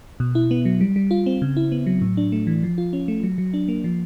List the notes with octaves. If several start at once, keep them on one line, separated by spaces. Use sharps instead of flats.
B2
E4
B3
F#3
G3
G3
F4
C4
C#3
E4
B3
F#3
A2
D4
A3
E3
F3
F4
C#4
A3
F#3
F#3
D4
A#3
F3